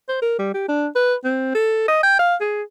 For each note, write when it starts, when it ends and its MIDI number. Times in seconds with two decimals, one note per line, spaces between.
0.09 0.18 72
0.22 0.37 70
0.39 0.52 55
0.54 0.66 67
0.69 0.88 62
0.95 1.15 71
1.24 1.50 60
1.55 1.87 69
1.88 1.99 75
2.03 2.18 79
2.19 2.36 77
2.41 2.63 68